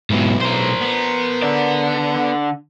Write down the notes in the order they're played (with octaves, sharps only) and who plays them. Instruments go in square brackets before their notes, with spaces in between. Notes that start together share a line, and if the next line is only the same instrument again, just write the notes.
[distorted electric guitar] B1 E4 [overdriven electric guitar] G#2 B2
[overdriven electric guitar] A#4 C5
[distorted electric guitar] B3
[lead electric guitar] D3 D5